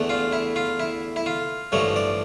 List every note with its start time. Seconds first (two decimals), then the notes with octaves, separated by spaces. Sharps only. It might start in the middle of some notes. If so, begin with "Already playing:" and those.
Already playing: E2 D3 A3
0.09 F4
0.33 E4
0.56 F4
0.80 E4
1.16 E4
1.26 F4
1.72 A1 G2 D3 F3 A3 C#5
1.96 D5